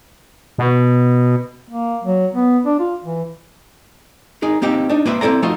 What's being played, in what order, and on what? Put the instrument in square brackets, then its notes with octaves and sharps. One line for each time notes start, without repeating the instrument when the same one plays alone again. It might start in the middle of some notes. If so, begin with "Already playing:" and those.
[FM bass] B2
[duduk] A#3
F#3
B3
D4
F4
E3
[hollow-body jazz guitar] D#4 G#4 A#4
A#3 C4 D#4 G4
D4 D#4
A#3 B4 C5 E5
C4 E4 A4 D5 A#5
F3 A3 D#4 F4 F#4